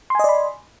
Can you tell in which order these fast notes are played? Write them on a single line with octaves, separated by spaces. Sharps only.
C6 G#5 D#5 D5 B5